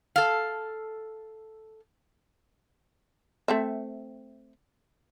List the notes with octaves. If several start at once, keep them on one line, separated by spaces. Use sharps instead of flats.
A4 F5
A3 C4 E5